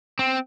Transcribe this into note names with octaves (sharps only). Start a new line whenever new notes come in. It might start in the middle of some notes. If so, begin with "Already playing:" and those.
C4